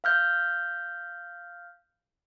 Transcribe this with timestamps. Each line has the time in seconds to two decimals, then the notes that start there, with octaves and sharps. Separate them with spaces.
0.04 F5 F6 G6